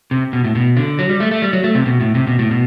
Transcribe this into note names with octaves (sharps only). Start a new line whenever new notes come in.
C3
B2
A2
B2
D3
F#3
G3
A3
A3
G3
F#3
A3
C3
B2
A2
C3
B2
A2
B2